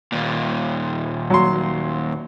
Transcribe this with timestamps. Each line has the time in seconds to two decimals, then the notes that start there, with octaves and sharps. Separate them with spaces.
0.12 D#2 A#2
1.30 F#3 C6